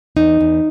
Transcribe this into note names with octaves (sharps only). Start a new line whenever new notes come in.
E2 D#4
E2